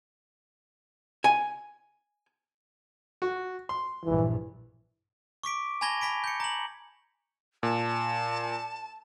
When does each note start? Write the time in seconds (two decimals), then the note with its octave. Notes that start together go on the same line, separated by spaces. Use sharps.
1.24 G#5
3.22 F#4
3.69 C6
4.05 A#1 G2 E3
5.43 C#6 D6 B6 D7
5.81 G#5 A5 B5 G#6 A#6 G7
6.01 G#5 B5 B6 D7
6.24 G6 C#7
6.40 A#5 F#7
7.63 A#2 A5